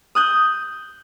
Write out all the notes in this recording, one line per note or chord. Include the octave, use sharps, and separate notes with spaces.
D#6 F#6 G6